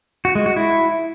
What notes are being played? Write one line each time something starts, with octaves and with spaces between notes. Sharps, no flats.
F#4
G#3
F#4
E4